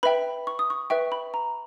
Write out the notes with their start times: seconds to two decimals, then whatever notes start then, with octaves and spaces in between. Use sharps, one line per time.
0.03 B4 E5 G5 B5
0.47 C#6
0.59 D#6
0.70 C#6
0.90 B4 E5 G5 C#6
1.12 B5
1.34 A#5